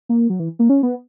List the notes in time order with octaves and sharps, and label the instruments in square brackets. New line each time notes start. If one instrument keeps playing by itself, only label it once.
[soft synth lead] A#3
F#3
E3
A#3
C#4
B3